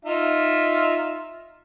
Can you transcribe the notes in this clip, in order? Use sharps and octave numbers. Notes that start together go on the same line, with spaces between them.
D#4 F4 E5